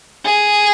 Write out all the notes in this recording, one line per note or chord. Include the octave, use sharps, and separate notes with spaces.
G#4